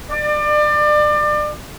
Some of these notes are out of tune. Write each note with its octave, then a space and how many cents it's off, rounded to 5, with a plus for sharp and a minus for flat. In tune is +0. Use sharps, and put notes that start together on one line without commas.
D5 +30